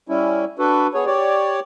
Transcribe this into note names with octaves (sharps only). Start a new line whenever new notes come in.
G3 C#4 E4
D4 F#4 A4 B4
B3 G#4 C#5
G4 C#5 D5